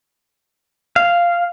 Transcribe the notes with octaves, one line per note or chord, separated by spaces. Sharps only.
F5